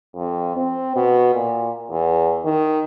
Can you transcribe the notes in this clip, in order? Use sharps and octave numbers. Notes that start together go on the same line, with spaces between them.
F2
C4
B2
A#2
E2
D#3